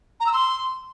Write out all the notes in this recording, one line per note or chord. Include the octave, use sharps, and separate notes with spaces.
A#5
E6
C6